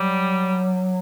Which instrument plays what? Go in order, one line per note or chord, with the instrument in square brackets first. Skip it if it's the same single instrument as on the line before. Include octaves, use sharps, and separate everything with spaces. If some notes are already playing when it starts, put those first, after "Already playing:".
Already playing: [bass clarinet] F#3 [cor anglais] G3